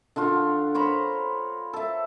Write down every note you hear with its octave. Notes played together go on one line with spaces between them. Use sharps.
D3 D4 F4 F#4
C5 C#5 A#5 B5
A4 E5